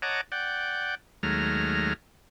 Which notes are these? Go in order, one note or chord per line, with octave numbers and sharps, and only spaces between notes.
C#5 D#5 F#5 A5 A#5 D6
D5 F#5 G5
D#2 F#3 G#3 A3 A#5 F6